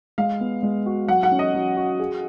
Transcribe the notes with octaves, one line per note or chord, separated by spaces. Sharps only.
G#3 F5
B3
G#3
F#4
F#3 F#5
F#5
C#4
D#5
F#3
F#4
G#4